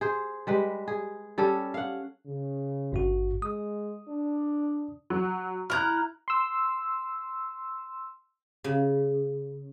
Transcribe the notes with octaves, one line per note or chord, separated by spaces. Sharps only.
G#4 C5
G3 G#3 B4
G#4
G3 C#4 A4
F5 F#5
C#3
G#1 G2 F#4
G#3 D#6
D4
F#3
E4 A#5 F6 F#6
C6 E6
C#3